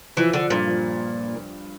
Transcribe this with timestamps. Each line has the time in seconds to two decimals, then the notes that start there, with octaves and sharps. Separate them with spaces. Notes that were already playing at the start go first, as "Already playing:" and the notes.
0.17 E3 F3
0.33 D3 F3
0.50 G2 A#2
0.67 F3